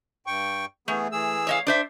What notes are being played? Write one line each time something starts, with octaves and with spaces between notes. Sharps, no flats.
G2 G5 C#6
E3 A3 B3 G#4
E3 G#4 E6
C#5 D#5 F5
D4 C5 E5